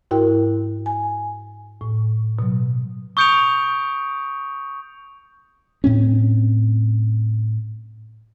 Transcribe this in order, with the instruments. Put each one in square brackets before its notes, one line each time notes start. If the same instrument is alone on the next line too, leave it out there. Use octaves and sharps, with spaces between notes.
[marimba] G#2 E4 F#4 A#4 G5
G#5
A2
B2 F#3
[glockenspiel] C#6 D#6 G6 C#7 D7 F7
[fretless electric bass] A2 C4 C#4